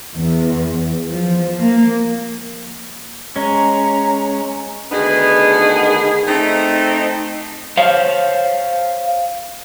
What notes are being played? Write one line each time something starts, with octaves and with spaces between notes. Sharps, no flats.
E2
F3
A#3
G#3 C#4 A#5
D2 D#3 B3 D#4 G#4
A3 C4 D#4
C5 C#5 F5